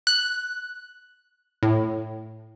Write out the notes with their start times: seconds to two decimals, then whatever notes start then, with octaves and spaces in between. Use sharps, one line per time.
0.07 F#6
1.63 A2